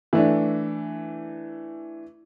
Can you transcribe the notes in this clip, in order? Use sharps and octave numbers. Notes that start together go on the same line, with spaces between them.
E3 A3 D4